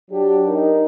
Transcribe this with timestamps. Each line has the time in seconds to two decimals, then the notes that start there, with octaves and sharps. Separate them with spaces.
0.11 F#3 D4 G4
0.47 D#4 A#4